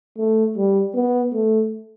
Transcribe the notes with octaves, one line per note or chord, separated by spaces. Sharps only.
A3
G3
B3
A3